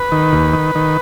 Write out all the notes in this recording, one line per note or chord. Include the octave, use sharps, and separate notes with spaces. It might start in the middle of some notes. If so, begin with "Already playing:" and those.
Already playing: B4
D#3
D#2
D#3
D#3